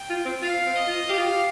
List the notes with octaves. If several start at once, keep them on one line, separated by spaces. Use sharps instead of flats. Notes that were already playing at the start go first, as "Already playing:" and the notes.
Already playing: G5
F4
C4
F4 F5
C4
D#5
F4
G4 F5
F4
G4